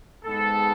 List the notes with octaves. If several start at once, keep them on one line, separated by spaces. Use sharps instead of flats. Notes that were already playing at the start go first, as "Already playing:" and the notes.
G#2 G#3 B3 A4